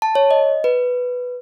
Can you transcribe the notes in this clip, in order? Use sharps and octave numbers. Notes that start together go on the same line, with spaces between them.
A5
C#5
D#5
B4